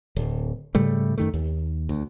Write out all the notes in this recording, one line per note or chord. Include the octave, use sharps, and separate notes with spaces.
D1
G#2 C#3 G3 A3
F#2 D#3 A3
D#2
D2